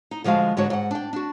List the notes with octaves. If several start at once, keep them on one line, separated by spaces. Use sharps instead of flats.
D#4
D3 F3 G#3 F#4 F5
G#2 D3 G#3 F#4 C#5
G#2 F#5
D4 G5
D4 F#4